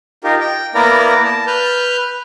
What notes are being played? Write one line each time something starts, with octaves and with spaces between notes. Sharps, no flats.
D#4 F4 G4 A#4
G5
A#3 B3 E4 A#4 D5 A#5
A5
B4 F6 G6